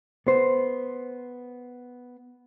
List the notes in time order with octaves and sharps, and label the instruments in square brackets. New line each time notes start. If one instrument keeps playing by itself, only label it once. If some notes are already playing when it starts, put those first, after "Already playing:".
[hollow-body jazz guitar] B3 C5